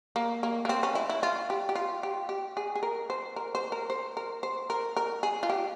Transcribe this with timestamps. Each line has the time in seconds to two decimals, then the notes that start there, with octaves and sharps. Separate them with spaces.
0.16 A#3
0.43 A#3
0.65 A#3
0.69 C4
0.83 C#4
0.95 E4
1.09 E4
1.23 F4
1.50 G4
1.69 G4
1.76 F4
2.03 G4
2.29 G4
2.57 G#4
2.75 G#4
2.83 A#4
3.10 C5
3.36 A#4
3.55 C5
3.72 A#4
3.90 C5
4.17 A#4
4.43 C5
4.70 A#4
4.97 A#4
5.23 G#4
5.43 F4
5.50 G4